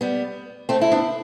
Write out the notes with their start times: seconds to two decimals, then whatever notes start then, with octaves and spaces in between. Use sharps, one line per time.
0.01 G3 B3
0.69 A3 C4
0.81 E4
0.92 B3 D4